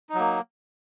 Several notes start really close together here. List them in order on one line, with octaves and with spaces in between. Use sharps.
D#4 F#3 A#3